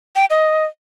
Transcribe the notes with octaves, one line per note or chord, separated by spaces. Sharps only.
G5
D#5